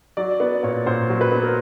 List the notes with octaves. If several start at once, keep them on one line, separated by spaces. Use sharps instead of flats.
F#3 D5
B3 D5
A#2 C#5
A#2 C5
F#3
B4
B3
A#4